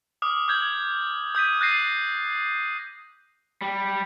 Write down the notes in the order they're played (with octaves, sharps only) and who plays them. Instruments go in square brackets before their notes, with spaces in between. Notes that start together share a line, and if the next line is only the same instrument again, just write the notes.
[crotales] D6 D#6 F6
D6 F6 G6 G#6 F#7
D#6 G6 B6 D#7
F#6 G6 A6 A#6 C7 D#7
[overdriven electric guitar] G3